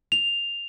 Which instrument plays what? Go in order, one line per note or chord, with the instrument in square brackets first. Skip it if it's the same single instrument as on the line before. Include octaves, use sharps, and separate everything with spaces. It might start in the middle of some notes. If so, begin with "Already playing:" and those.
[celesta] F7